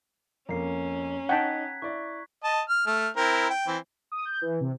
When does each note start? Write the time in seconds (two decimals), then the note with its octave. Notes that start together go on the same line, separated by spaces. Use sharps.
0.49 F2 A#3 C#4 A#5 C7
1.29 D#4 D#5 F#5 G5 A5 F#6 G#6 B6
1.82 E4 D5 E5 C#6
2.44 D#5 A5
2.70 F6
2.87 A3 F6
3.17 C4 E4 A#4
3.50 G5
3.67 E3 C4
4.12 D#6
4.25 G6
4.42 E3
4.61 C3